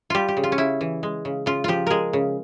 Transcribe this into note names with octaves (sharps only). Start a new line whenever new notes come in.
G3 F4 G4
G4
C#3
F4
C#4
C#3 E4
E3
G#3
C#3
C#3 F4
F3 F4 G4
G#3 G#4 A#4
C#3